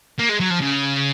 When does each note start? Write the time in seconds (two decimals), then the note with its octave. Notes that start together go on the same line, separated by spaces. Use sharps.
0.19 A#3
0.29 G#3
0.40 F#3
0.50 F3
0.61 C#3